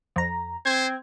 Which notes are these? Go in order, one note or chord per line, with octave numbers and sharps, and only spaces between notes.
F2 A#5
C4 C5 G#6